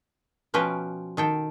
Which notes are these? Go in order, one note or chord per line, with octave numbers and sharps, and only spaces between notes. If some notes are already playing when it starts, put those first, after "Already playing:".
B2 F3 C#4 B4 C5 G5
D#3 A4 G5